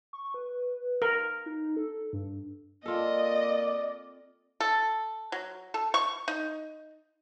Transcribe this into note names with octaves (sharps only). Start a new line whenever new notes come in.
C#6
B4
A#4
D#4
A4
G2
A#3 C4 F4 A4 D5 D#5
A4
F#3
A4
C#6
D#4